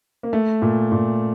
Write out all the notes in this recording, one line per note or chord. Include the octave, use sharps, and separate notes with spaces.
A#3
A3
A#2
A#2